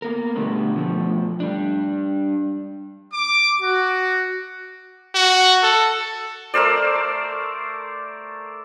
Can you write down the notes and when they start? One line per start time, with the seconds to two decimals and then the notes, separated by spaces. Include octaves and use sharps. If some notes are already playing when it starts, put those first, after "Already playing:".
0.02 A#3 B3 A#4
0.36 B2 D3 G3 A3 B3
0.75 B2 F3 A3
1.40 G3 D4
3.13 D6
3.61 F#4
5.15 F#4
5.63 A4
6.54 A3 A#4 C5 D5